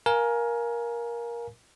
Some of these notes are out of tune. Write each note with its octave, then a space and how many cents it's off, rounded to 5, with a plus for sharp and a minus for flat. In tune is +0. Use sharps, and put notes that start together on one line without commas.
A#4 +15 F5 +0 G#5 +15